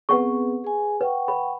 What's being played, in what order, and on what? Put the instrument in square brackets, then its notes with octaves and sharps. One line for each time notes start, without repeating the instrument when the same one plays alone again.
[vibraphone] B3 C4 G#4 [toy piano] B4 F#5 C#6
[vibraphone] G#4 G#5
[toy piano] B4 [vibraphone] F#5 G5 C#6
[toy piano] B5